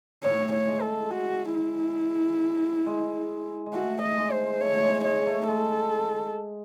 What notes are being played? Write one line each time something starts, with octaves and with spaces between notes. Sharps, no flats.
A2 C#5
C#5
G#3
A4
F#4
E4
G#3
G#3
A3 F#4
D#5
G#3
C5
A3 C#5
G#3
G#3 C#5
A3
G#3 A4